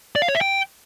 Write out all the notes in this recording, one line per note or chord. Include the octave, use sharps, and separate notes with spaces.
D5
F5
C#5
E5
G5